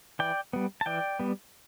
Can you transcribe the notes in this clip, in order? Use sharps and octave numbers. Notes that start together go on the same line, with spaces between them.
E3 D5 G5
G3 B3
A5
E3 D5 G5
G3 B3